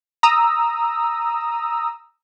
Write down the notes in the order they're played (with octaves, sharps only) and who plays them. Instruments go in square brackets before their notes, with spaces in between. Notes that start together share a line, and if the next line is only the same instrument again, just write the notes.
[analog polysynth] A#5 D#6 E6